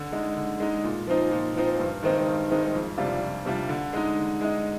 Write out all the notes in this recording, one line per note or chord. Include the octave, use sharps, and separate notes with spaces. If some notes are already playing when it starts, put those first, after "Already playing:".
Already playing: D3
G#3 D#4
D3
G#3 D#4
A#2
F3 C4 D#4
A#2
F3 C4 D#4
G2
D#3 G#3 C4 D#4
G2
D#3 G#3 C4 D#4
F2
C3 G3 D4 F4
F2
C3 G3 D4 F4
D3
G#3 D#4
D3
G#3 D#4